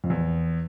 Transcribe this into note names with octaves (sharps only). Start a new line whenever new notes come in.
F2
E2